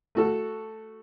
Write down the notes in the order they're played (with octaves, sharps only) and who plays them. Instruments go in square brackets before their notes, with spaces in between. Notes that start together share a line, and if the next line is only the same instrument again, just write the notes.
[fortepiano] A3 F#4 A4